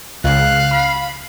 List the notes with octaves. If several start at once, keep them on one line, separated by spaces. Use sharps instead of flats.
C#2 F5 F#6
B5